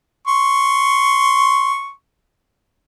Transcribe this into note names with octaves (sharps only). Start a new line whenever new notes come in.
C6 C#6